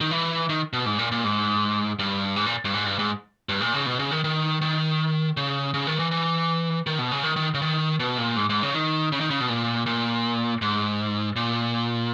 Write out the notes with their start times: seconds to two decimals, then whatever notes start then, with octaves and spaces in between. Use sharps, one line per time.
0.01 D#3
0.11 E3
0.49 D#3
0.73 B2
0.86 G#2
0.99 A#2
1.12 A#2
1.24 G#2
1.99 G2
2.36 G#2
2.46 A#2
2.65 G2
2.74 G#2
2.86 G2
2.99 G#2
3.49 G2
3.61 A#2
3.74 C#3
3.86 B2
3.99 C#3
4.11 D#3
4.24 D#3
4.62 D#3
5.37 C#3
5.74 C#3
5.87 D#3
5.99 E3
6.11 E3
6.87 D#3
6.99 B2
7.12 C#3
7.24 D#3
7.36 D#3
7.54 C#3
7.62 D#3
8.00 B2
8.18 A#2
8.36 G#2
8.49 G#2
8.63 C#3
8.74 D#3
9.12 C#3
9.21 D#3
9.30 C#3
9.40 B2
9.49 A#2
9.86 A#2
10.62 G#2
11.36 A#2